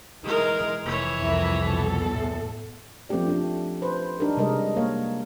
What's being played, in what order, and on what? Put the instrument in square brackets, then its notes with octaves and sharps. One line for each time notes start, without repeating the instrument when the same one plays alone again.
[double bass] E3 D#4 [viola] G#3 A#4
[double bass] F1 [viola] E3 C#5
[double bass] C2 F2 [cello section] E4 A#4
[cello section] B2 A4
[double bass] E2 A2
[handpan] F3 A3 C4 C#4 G4 D5
A3 D4
B4 C5
D4 D#4 G4 A4 A#4
C3 G3 G#3 A#4 D#5
A#3 C#5 F5